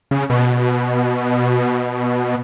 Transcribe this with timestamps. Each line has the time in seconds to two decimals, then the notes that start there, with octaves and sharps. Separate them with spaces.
0.11 C#3
0.30 B2